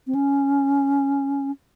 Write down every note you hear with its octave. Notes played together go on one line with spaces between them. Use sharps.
C4
C#4